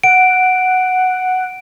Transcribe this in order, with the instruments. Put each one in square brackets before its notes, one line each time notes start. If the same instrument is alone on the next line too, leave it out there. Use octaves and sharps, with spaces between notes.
[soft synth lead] F#5 [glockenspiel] D7